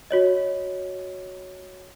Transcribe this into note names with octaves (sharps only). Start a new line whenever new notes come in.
F#4 C#5 D#5